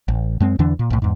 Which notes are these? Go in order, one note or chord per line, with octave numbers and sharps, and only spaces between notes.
A1
F#2 G#3 C4
E2 D3 E3 D4
A#2
B1 A2
E2 G#2